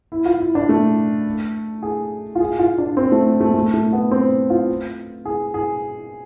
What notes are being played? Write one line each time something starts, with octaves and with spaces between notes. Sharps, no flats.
E4
F4
E4
D4
A3
G#4
F4
G#4
F4
D4
C4
A3
A3
A3
A3
B3
C4
F4
G#4
G#4